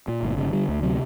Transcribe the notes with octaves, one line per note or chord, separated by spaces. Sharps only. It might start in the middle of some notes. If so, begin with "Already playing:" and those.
A#2
G1
C#3
D3 G3
D2
C3 F#3